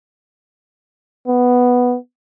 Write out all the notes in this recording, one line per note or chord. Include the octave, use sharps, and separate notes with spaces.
B3